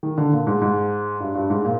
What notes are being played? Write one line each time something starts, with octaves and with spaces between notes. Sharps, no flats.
D#3
D3
A#2
G#2
G#2
G2
G2
G#2
A#2